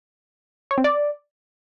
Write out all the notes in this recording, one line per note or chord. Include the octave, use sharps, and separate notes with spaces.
C#5
C4
D5